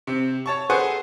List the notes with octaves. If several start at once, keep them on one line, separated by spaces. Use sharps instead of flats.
C3 C4
C#5 A5 C#6
G#4 A4 B4 C5 F#5 G#5